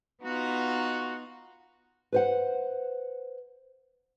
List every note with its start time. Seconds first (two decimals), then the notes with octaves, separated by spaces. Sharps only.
0.23 B3 D#4 F4 F#4
2.12 B4 C5 F#5